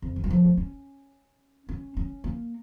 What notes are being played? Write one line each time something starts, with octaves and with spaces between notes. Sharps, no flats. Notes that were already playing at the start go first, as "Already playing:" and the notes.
F2
E3
G3
F3
A3
C#4
C#4
C#4
A#3